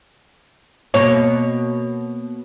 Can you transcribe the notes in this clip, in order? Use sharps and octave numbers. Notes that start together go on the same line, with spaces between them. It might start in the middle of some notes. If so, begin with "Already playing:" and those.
B2 A#3 C#5